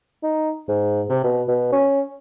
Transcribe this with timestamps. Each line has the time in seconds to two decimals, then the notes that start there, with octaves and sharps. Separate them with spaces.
0.23 D#4
0.68 G#2
1.09 C3
1.24 B2
1.48 B2
1.72 C#4